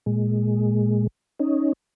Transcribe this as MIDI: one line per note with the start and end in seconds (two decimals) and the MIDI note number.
0.06 1.07 46
0.06 1.07 56
1.39 1.73 61
1.39 1.73 63